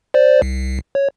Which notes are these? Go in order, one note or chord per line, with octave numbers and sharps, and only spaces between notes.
C5 D5
C2
C#5